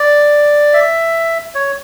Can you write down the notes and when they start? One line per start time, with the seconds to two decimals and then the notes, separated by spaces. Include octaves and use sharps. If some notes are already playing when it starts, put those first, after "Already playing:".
Already playing: D5
0.74 E5
1.55 C#5